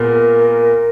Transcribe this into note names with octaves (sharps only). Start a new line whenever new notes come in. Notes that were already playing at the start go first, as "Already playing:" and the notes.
Already playing: A#2 G#3 B3 A#4